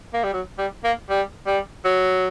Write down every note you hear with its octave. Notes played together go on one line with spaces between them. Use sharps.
A#3
G3
F#3
G3
A#3
G3
G3
F#3